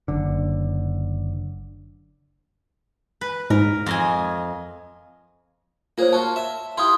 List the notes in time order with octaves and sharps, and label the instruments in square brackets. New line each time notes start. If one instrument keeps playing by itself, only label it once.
[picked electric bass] F#1 D3
[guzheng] B4
[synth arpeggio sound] G#2 [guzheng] A#4
[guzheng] F2 D#5 G#5
[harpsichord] A#3 G#4 [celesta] F4 C5 C#5
[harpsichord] F4 F#4 [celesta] A5
[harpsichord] E5
[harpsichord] E4 F4 G4 [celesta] C6 D#6